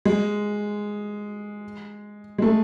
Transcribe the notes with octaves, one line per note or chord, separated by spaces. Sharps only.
G#3
G#3
A3